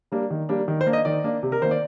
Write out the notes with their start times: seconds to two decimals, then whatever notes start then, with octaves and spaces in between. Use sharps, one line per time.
0.12 G3 A#3 D4
0.30 D#3
0.49 G3 A#3 D4
0.68 D#3
0.81 C5
0.87 A#3 D4
0.93 D#5
1.05 D#3 D5
1.24 A#3 D4
1.43 C3
1.52 A#4
1.62 D#3 A#3 C5
1.71 D5